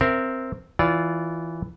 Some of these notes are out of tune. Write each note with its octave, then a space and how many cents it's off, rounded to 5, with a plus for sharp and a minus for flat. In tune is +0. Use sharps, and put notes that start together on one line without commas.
C4 +0 A#4 +0 E5 +20
E3 +0 F4 -5 D5 -30